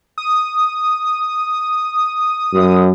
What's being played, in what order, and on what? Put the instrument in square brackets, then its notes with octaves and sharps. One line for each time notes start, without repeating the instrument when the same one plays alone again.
[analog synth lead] D#6
[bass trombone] F#2